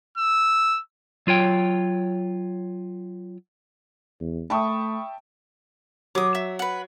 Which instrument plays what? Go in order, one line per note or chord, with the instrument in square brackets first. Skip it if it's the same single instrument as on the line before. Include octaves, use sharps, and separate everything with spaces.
[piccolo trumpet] E6
[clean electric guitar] F#3 F4 C#5 G5
[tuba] E2
[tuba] A3 [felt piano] E5 G5 A5 [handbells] B5 C#6 D#6
[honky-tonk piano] F#3 [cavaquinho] D6 D#6
[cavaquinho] E5
B4 F#5